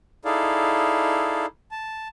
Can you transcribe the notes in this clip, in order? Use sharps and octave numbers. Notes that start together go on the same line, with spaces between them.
D#4 E4 G#4 A4 D5 F5
A5